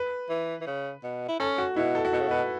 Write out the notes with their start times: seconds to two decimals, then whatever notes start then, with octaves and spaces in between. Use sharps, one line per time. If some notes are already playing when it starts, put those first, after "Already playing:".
Already playing: B4
0.30 E3
0.61 E3
0.67 C#3
1.03 B2
1.28 E4
1.40 C#4 A4
1.58 F#4
1.76 B2 E4
1.95 A4
2.05 F#4
2.13 B2 A4
2.20 C#3
2.28 B2 B4